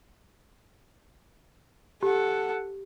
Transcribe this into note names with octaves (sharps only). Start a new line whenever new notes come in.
G4 A4 F#5